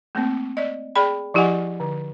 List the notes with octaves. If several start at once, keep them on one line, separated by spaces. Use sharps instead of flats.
A3 A#3 C4
D5 D#5
G#4 D5 G5 B5
F3 E4 G4 D#5 F#5 G#5
D3